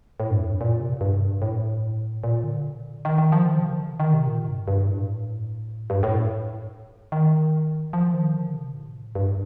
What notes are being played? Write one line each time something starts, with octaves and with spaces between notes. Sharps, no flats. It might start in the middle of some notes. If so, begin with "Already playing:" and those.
A2
G2
F2
G2
A#2
C3
A2
G2
A2
A#2
D3
D#3
D#3
F3
D#3
C3
D3
D#3
D#3
C3
A#2
G2
G2
A2
G2
A2
D#3
F3
D#3
D3
C3
A2
G2